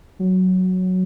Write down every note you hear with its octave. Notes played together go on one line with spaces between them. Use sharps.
F#3